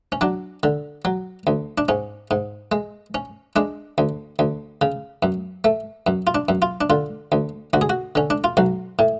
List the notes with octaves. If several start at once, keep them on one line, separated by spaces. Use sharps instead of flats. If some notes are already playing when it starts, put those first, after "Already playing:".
C#4
F#3 D4
D3
F#3
D2
D4
G#2 C#4
G#2
G#3
C#4
G#3 D4
D2
D2
C#3
F#2
A3
F#2
F4
D4
F#2
F4
D4
D3 F4
D2
D2 F#4
G#4
F#4
D3 C#4
D4
F4
B1 F#4
A2